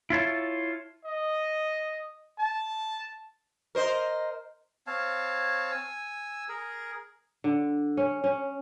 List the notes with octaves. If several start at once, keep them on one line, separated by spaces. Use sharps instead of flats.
E4 F4 C#5 A5
D#5
A5
A#4 C5 D#5
C4 C#5 F5 A5
G#5 E6
G#4 A#4
D3
C#4
C#4